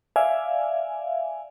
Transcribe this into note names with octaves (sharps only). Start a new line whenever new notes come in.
D5 E5 F5 G#5